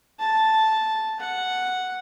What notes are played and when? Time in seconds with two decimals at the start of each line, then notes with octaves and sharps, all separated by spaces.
0.20 A5
1.20 F#5